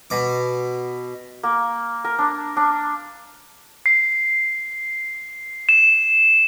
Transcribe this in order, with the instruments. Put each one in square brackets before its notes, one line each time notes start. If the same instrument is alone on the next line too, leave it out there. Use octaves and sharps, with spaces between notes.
[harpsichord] B2 D6
[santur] A#3
A#4
D4
D4
[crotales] C7
E7